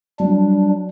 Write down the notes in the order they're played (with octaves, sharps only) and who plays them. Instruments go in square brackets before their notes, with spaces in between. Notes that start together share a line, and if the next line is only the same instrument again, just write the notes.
[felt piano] F#3 [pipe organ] G3 D4